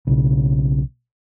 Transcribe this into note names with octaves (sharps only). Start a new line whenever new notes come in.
B1 C#3